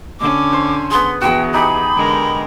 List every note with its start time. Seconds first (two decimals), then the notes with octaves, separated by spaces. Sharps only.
0.20 D3 C#4 D6
0.53 C5
0.91 B3 G#4 C6
1.22 E2 F#4 G#4 G5
1.54 D#4 G4 G#4 B5
1.96 D3 G#3 A#4